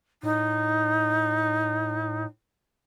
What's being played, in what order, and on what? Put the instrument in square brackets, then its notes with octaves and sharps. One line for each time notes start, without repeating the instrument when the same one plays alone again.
[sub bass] A2 [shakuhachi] D#4